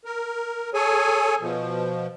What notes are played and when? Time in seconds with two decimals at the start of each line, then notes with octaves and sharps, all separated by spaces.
0.05 A#4
0.74 G#4 A4 C#5 G#5
1.41 B2 F3